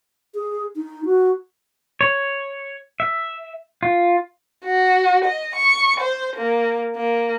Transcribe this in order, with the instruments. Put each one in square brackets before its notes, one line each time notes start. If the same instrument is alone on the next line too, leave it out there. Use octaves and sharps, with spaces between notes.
[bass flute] G#4
D#4
F#4
[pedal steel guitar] C#5
E5
F4
[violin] F#4
D#5
C#6
C5
A#3
A#3